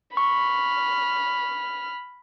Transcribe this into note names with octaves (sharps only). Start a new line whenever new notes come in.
B5 C#6 F6